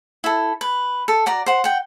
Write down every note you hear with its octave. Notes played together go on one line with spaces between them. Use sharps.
E4 A4
B4
A4
F#4 D5 A#5
C5 F#5
F#5 G5